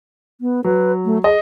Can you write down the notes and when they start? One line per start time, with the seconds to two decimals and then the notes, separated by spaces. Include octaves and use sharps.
0.41 B3
0.64 F#3 B4
1.05 A3
1.24 G#4 D#5